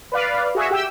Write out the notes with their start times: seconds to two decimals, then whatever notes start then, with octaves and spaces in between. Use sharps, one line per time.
0.12 B4 D5 F5
0.55 F#4 G#4 E5
0.71 G4 G5 E6